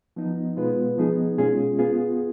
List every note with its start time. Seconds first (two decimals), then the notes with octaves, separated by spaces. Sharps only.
0.16 F3 B3 D#4
0.57 B2 G#3 B3 F4 B4
0.98 F3 B3 D#4 G#4
1.38 B2 G#3 C#4 F4 G#4
1.79 B3 F4 G#4